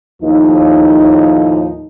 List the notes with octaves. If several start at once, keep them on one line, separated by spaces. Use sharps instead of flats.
D#2 A2 F3 D#4